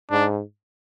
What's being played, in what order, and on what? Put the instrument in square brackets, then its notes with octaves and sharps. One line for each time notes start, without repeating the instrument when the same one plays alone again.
[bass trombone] G#2 [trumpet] D4